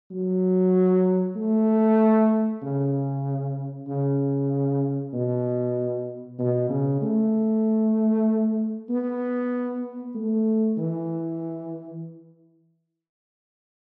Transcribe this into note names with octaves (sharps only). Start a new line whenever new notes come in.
F#3
A3
C#3
C#3
B2
B2
C#3
A3
B3
A3
E3